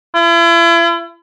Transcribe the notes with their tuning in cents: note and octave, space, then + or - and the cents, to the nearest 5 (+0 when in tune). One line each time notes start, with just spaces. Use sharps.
E4 +40